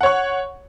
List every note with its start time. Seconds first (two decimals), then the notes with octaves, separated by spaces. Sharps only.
0.01 F#5
0.03 C#5
0.06 C#6